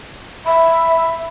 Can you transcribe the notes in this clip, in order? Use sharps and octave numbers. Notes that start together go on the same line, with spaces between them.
E5 B5